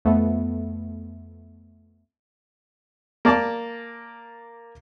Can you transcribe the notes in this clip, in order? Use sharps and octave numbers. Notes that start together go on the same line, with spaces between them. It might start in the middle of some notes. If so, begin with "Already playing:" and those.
F2 A3 B3
A#3 D5 A5 D6